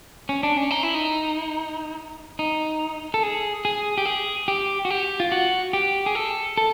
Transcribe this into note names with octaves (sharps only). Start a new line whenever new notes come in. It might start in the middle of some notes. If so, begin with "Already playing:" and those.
C#4
D4
C#4
D#4
E4
D#4
D#4
A4
G#4
G#4
G4
G#4
G4
F#4
G4
F4
F#4
G4
G#4
A4
A4